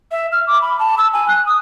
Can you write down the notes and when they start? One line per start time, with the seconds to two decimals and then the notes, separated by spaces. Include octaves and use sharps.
0.12 E5
0.32 F6
0.47 D6
0.61 B5
0.79 A5
0.98 E6
1.13 G#5
1.28 F#6
1.46 D#6